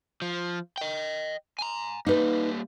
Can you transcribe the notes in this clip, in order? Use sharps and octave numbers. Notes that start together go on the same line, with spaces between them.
F3
D#5 G5
G#5 A#5
G3 A#3 D#4 B4